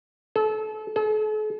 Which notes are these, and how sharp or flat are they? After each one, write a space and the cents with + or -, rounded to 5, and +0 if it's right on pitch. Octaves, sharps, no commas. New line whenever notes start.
A4 -30
A4 -45